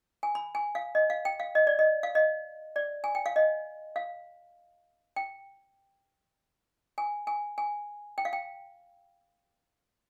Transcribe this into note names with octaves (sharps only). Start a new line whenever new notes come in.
G#5
B5
G#5
F5
D#5
F5
G5
F5
D#5
D5
D#5
F5
D#5
D5
G#5
G5
F5
D#5
F5
G5
G#5
G#5
G#5
G5
F5
G5